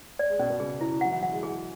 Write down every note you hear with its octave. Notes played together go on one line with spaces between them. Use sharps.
D5
G#3
B2 C#4
B2
C#3 G#4
E4
F#3 F#5
E3
F#3 F#5
G#3
G#3 G#4